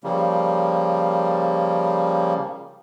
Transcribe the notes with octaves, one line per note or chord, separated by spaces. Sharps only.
C#3 F3 G3 A#3